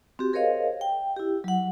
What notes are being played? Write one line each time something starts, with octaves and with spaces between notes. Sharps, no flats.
C4 F#4 G4
G#4 A#4 C5 C#5 D#5 F5
G5
E4 G4
F#3 F#5